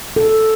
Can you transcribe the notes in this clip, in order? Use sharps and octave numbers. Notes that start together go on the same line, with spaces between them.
A4